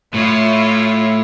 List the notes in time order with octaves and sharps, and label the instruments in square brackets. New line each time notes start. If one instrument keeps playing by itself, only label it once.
[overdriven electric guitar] A2 [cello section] F4 C#5 E5